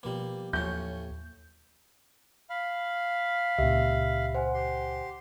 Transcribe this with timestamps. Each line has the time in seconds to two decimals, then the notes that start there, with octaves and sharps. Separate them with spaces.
0.03 B2 F3 G3 A#3 B4
0.53 D#2 A2 F3 F#3 C#4 G6
2.50 F5 B5
3.58 C#2 A#2 G4 E5
4.35 C5 F#5 G#5
4.54 G4 C6